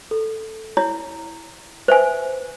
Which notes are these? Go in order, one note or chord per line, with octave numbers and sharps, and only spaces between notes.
A4
E4 C#5
B4 C5 E5 G#5